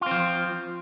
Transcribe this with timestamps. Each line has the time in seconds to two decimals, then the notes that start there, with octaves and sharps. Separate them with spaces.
0.01 F4
0.06 C4
0.11 F3